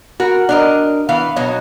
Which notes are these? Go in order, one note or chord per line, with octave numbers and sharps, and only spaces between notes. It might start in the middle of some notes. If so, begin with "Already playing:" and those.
F#4 A#4
D4 A#4 D#5
E3 B3 F5
B2 F#3 D#4